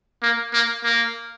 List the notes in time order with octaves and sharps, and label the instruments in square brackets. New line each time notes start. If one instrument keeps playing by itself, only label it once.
[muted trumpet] A#3
A#3
A#3